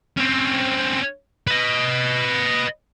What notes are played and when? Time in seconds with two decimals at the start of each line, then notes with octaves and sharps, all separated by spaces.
0.17 C4 C#4
1.47 B4 D#5